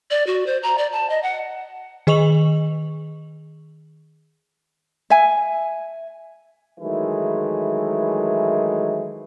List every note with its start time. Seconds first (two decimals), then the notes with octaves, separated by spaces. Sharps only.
0.11 D5
0.27 F#4
0.46 C5
0.63 A#5
0.78 D5
0.93 A5
1.10 D#5
1.23 F#5
2.07 D#3 G#4 D#5 C#6 F7 F#7
5.10 E5 G#5
6.80 D#3 E3 F#3 G#3 A3 E4